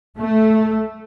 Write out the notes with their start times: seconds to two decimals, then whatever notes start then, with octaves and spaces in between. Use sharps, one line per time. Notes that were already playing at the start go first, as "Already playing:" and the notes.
0.19 A3